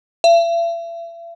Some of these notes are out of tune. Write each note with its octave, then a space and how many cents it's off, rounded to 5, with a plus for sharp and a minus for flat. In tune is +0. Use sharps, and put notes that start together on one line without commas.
E5 +40